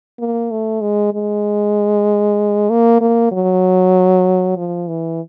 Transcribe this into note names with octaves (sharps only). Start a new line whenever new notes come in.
A#3
A3
G#3
G#3
A#3
A#3
F#3
F3
E3